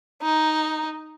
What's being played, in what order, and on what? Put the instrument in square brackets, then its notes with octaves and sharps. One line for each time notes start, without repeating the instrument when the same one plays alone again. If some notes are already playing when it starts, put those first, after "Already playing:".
[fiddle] D#4